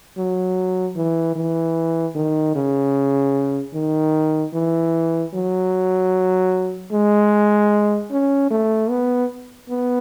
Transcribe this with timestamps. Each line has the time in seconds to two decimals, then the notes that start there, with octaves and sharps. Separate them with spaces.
0.18 F#3
0.96 E3
1.36 E3
2.15 D#3
2.55 C#3
3.74 D#3
4.53 E3
5.34 F#3
6.92 G#3
8.11 C#4
8.51 A3
8.90 B3
9.70 B3